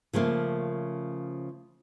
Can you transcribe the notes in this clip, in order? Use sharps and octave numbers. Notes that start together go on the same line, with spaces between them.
C#3 F3 A3 A#3